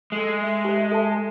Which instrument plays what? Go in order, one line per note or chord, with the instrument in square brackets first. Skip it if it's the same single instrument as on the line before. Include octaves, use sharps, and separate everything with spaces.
[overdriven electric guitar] G#3 [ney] A4
[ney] E5
[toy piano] G4 C5
A4 A5